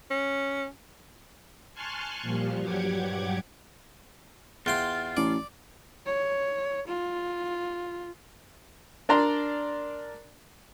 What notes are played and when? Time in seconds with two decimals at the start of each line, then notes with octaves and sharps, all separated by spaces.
0.11 C#4
1.74 G#5 A5 C6 C#6 F6 F#6
2.22 A#2 F3 G3
2.60 G2 F#3 G4 F#5 D6 G#6
4.66 E2 F4 G5 C6
5.17 A1 D5
6.07 C#5
6.88 F4
9.09 D4 A#4 D5 A#5 C6